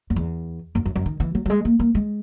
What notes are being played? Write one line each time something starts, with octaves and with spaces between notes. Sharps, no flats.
F#2
E2
F#2
F#2
F#2
D#3
E3
F#3
F#3
G#3
A#3
A#3
G#3